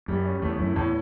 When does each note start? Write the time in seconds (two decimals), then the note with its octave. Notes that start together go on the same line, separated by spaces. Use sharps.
0.08 F#2 G3
0.25 C#4
0.42 E2 A3
0.59 F#2 E4
0.76 E2 A2